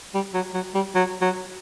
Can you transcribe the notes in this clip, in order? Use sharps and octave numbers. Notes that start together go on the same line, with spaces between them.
G3
F#3
F#3
G3
F#3
F#3